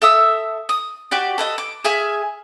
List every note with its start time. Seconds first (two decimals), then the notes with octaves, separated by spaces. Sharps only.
0.02 A4 E5 D#6 E6
0.69 D#6
1.11 F#4 G4 D5
1.38 A4 B4 D#5
1.58 D6
1.84 G#4 E5 G#5 F6